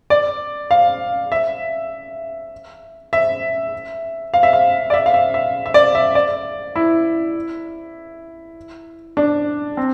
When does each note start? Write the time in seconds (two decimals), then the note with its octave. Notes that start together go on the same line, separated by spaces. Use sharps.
0.10 D5
0.71 F5
1.32 E5
3.13 E5
4.34 F5
4.43 E5
4.53 F5
4.90 D5
4.94 E5
5.06 F5
5.14 E5
5.34 E5
5.66 E5
5.74 D5
5.95 E5
6.15 D5
6.76 E4
9.17 D4
9.77 C4